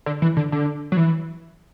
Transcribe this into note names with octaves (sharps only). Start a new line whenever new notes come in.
D3
E3
D3
D3
F#3
E3